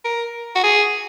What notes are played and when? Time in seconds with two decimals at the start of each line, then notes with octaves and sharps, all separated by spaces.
0.05 A#4
0.55 F#4
0.63 G#4